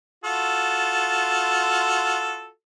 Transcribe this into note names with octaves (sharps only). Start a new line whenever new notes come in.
F4 F#4 A4